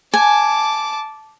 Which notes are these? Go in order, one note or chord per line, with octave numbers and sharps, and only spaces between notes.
G#5 A5 D6